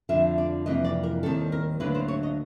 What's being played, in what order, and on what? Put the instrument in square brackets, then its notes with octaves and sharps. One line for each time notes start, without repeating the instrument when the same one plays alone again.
[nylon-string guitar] F2 D3 F3 E5
D5
F2 C3 E3 G3 A#3 D#5
D5
A#4
D#2 D#3 G3 C4 A4
A#4
D2 D3 F#3 A#3 B4
C5
C#5
D#5